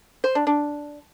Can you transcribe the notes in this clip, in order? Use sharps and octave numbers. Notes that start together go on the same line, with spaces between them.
C5
D4
D4